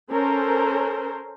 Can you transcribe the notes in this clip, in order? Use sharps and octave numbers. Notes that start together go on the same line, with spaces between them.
C#4 A4 A#4 C5